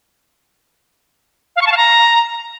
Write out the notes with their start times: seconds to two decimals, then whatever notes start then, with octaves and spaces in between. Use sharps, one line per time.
1.56 F5
1.61 C#6
1.67 A5
1.72 F5
1.77 A#5